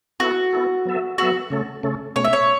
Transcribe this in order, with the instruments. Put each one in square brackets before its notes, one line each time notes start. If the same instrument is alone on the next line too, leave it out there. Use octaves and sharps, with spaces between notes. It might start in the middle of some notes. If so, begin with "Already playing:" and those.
[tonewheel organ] B3 E4 A4 [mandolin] F#4
[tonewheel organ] B3 E4 A4
F#3 B3 A4 E5
[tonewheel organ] F#3 B3 A4 E5 [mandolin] F#4
[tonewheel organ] C#3 A3 C#4 A4
C#3 A3 C#4 A4
[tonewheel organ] B2 A3 C#4 [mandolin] C#5
[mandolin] E5
C#5